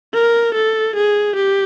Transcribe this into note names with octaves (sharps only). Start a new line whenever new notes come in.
A#4
A4
G#4
G4